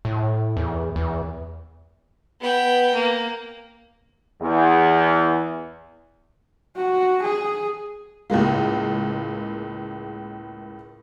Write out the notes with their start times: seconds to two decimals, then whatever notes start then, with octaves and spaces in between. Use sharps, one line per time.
0.05 A2
0.57 E2
0.96 E2
2.41 B3 G5
2.94 A#3
4.42 E2
6.76 F#4
7.23 G#4
8.30 C#2 A2 G#3 A#3